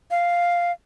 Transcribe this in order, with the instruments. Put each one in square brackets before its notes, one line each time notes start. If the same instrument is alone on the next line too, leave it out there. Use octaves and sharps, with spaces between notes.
[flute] F5